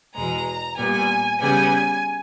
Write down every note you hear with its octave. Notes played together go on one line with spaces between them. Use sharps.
E2 B2 G#3 A#5
A#2 G3 B3 G#5
C#3 G3 B3 G#5